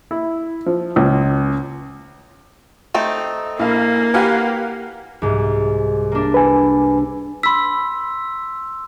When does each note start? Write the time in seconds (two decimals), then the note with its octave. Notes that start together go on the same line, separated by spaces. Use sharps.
0.11 E4
0.66 F3
0.96 C#2
2.94 A3 C4 D#4
3.59 A#1 A#3 E4 F5
4.14 G4 A#4 B4 F5 F#5 G#5
5.22 C2 G#2
6.12 A#3 D4
6.34 B4 G#5
7.43 B5 C6 E6 B6